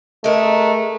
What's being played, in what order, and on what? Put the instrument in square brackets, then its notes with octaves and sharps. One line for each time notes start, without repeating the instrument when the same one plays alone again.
[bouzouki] G#3 A#4 [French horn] A3